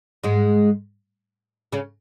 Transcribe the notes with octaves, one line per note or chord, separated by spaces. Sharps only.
G#2 G#3
C#3 C#4